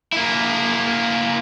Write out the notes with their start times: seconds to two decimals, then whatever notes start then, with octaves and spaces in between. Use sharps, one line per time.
0.12 A#3 E4